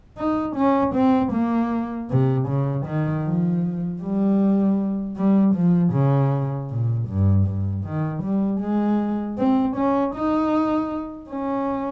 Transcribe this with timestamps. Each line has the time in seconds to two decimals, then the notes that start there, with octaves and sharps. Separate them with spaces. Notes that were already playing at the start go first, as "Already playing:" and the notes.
0.18 D#4
0.56 C#4
0.95 C4
1.33 A#3
2.10 C3
2.48 C#3
2.86 D#3
3.25 F3
4.01 G3
5.16 G3
5.55 F3
5.93 C#3
6.70 A#2
7.08 G2
7.46 G2
7.85 D#3
8.23 G3
8.61 G#3
9.38 C4
9.77 C#4
10.15 D#4
11.30 C#4